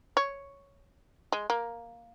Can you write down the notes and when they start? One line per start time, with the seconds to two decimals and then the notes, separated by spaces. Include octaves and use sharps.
0.17 C#5
1.32 G#3
1.50 A#3